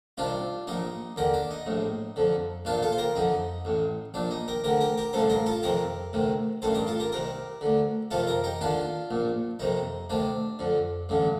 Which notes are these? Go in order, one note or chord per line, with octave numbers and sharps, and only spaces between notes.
C2 C3 D#3 D4 F4
A#1 A#2 D#4 G4
D#2 D3 G4 A#4
D4
D#4
A#1 A2
F2 D3
A#1 A#2 D4 F4
F4 A4
C5
G4 A#4
F2 D3 D#4
A1 A2
A#1 A#2 D4
D#4
G4 A#4
D2 D3 G4 A#4
G4 A#4
G4 A#4
A1 G2 D3 A4 C5
G4 A#4
F4 A4
F2 C3 D#3 G4 A#4
D2 C3 D#3
A1 G2 D#3 A4 C5
G4 A#4
F4 A4
G4 A#4
C2 C3 D#3 G4 A#4
D2 D3
F2 C3 D#3 F4 A4
G4 A#4
D#4 G4
D#2 D3 D4 F4
A#1 A#2
F2 C3 D#3 D#4
D2 C3 D#3 D4
F2 D3
A1 G2 D3